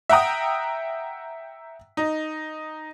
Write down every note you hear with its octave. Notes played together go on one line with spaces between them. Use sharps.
E5 F#5 G5 A#5 D#6
D#4